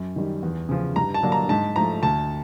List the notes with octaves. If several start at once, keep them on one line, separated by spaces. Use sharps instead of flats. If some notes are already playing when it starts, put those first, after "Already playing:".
Already playing: F#2
D#3 G3
E2
C#3 F3
G2 A#5
A5
D3 F#3 A#3 D4
A#5
G#2 A5
F3 A3 A#5
D2 A5